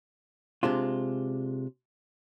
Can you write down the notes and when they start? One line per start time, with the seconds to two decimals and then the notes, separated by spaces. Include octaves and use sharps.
0.63 C3 G#3 D4 F4